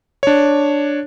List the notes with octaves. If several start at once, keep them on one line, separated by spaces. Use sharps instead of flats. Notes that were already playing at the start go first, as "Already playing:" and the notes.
D4 C#5